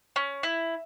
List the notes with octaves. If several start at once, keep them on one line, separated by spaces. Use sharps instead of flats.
C#4
E4